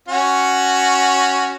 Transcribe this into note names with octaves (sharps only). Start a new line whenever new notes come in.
C#4 F#4